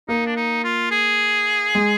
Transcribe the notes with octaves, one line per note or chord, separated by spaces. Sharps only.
A#3 D#4
D4
D#4
F4
G#4
G#3